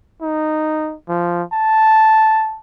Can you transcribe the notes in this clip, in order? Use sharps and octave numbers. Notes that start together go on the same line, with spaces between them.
D#4
F3
A5